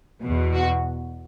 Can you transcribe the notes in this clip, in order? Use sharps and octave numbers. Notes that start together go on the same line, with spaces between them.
E2 B2
F#4